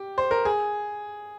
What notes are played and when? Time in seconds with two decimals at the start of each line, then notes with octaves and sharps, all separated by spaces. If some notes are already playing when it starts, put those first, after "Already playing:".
Already playing: G4
0.18 C5
0.31 A#4
0.45 G#4